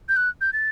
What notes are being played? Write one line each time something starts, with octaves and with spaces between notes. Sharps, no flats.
G6
F#6
G6
A6